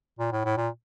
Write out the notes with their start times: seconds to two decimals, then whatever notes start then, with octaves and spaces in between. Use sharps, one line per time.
0.19 A#2
0.32 A2
0.45 A2
0.57 A#2